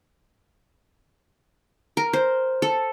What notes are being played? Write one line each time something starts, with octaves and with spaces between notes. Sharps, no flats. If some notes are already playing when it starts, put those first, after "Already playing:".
A#4
C5
A4